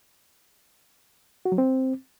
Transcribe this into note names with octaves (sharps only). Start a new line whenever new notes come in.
F#4
F#3
C4